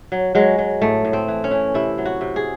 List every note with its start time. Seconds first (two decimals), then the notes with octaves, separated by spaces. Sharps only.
0.12 F#3
0.35 F#3 G#3
0.58 F#3
0.81 A2 A3
1.05 A2
1.13 C4
1.28 E3
1.44 C#4
1.51 E3
1.74 C3 E4
1.98 F#3
2.05 F#4
2.21 C3
2.36 G#4